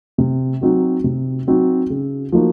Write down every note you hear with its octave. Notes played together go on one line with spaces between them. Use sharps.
C3
F#3 C4 D#4 F#4
C3
F#3 C4 D#4 F#4
C#3
F3 A#3 D#4 F#4